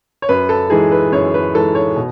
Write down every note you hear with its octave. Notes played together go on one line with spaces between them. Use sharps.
C#5
F#2 B4
A4
E3 G#3 D#4 G#4
B4
F#2 C#5
B4
E3 G#3 D#4 A4
C#5
B2